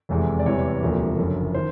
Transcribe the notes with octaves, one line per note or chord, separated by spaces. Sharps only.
F1 E2 C3 E3 G#3
D5
E2 C3 E3 G3 C#5
E1 D2 C3 F3 A#3
F#1 F#2 D3 F3
D#3 C5